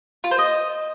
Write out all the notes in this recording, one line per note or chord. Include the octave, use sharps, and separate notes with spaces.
F4
C5
D#5